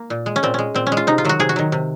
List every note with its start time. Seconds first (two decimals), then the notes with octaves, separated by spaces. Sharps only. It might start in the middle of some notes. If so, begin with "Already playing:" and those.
Already playing: A#3
0.10 A#2
0.26 G#3
0.36 C#4
0.43 A#2 C4
0.54 G#3 C#4
0.75 A#2 C4
0.87 C#4
0.92 G#3
0.97 F4
1.07 C3 D#4
1.18 F4
1.24 D#3 F#3 F#4
1.40 C3 G#4
1.49 F#4
1.56 D#3 F#3
1.72 C3